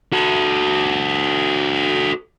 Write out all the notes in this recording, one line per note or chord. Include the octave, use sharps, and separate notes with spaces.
F#4 A4